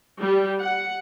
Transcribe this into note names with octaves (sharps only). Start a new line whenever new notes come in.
G3
F#5